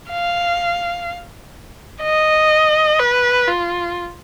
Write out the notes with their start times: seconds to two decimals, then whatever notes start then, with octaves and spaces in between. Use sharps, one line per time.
0.11 F5
2.02 D#5
2.99 B4
3.48 F4